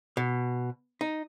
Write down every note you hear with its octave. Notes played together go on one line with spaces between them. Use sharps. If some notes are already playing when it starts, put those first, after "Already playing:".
B2
D#4